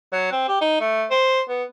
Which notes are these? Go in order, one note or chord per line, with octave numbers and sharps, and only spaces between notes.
F#3
C4
G4
D#4
A3
C5
B3